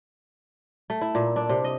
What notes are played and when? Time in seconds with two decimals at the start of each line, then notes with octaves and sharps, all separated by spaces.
0.90 A3
1.01 E4
1.15 A#2
1.36 D4
1.49 C3
1.64 D#5